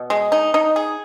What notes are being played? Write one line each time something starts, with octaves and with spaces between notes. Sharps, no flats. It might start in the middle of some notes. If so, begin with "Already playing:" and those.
Already playing: B2
G#3
D#4
D#4
G#4